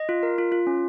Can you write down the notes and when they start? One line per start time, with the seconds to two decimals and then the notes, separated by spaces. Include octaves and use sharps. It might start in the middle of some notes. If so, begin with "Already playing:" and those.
Already playing: D#5
0.09 F4
0.23 A#4
0.38 F4
0.52 F4
0.67 C#4